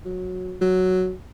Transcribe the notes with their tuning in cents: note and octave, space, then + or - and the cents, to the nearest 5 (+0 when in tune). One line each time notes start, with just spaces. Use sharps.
F#3 -15
F#3 +0